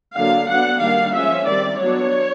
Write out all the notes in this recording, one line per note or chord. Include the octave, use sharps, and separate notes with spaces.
D3 F#3 A#3 D4 F5
F#3 B3 D4 F#5
D#3 G3 A#3 D4 F5
F3 G#3 C#4 E5
D#3 G3 C4 D5
F#3 B3 D4 C#5